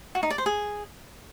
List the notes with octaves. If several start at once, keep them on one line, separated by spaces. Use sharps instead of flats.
F#4
D#4
D5
C5
G#4